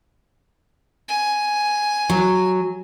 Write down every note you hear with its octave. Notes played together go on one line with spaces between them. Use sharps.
G#5
F#3